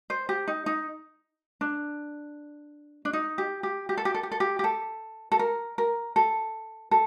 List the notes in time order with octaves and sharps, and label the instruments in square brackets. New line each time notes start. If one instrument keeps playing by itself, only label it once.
[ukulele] C5
G4
D#4
D#4
D4
D4
D#4
G4
G4
G4
A4
G4
A4
G4
A4
G4
G4
A4
A4
A#4
A#4
A4
A4